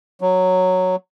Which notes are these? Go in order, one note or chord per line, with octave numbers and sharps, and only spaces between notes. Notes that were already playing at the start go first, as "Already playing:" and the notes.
F#3